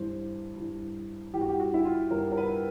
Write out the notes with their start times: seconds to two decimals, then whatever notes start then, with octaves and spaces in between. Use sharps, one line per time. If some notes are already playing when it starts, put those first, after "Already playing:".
Already playing: G2 E3 C5
0.56 G2 E3
1.33 E3 G4
1.37 G2 F#4
1.49 G4
1.60 F#4
1.74 E4
1.85 F4
2.11 G2 E3 A#4
2.32 A#4
2.37 B4